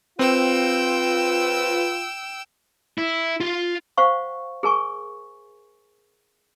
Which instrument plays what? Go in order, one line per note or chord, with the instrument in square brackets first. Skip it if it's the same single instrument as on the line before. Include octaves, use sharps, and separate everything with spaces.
[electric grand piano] C4 [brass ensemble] F4 [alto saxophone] B4 [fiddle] G5 E6
[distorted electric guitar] E4
F4 C6
[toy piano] C5 F5 F#5 C#6
G#4 A#4 G#5 C#6